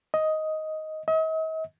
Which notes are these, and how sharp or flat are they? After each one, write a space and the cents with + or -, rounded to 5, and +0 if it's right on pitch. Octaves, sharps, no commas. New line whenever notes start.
D#5 +10
D#5 +45